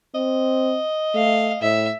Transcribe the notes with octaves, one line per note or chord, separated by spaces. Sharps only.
C4 D#5
A3 F5
A2 E5